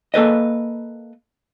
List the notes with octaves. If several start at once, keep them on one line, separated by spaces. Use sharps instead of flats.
A#3 A4 B4 D#5